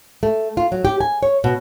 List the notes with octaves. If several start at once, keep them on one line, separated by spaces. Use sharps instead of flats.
A3
F4
F#3
G4
G#5
C#5
B2